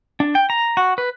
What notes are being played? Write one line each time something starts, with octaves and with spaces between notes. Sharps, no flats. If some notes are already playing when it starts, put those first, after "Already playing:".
D4
G5
A#5
F#4
B4